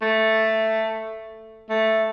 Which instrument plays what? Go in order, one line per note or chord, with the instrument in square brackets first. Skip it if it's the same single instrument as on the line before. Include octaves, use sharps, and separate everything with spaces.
[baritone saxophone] A3
A3